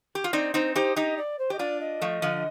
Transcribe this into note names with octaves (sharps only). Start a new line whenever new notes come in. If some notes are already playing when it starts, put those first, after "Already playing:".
G4
F4
C4 D#4 D5
C4 D#4 C5
D#4 G4 C5
D#4 G4 D#5
D5
C5
G4 D#5
D4 F4 D5
D#5
F3 A3
D3 F3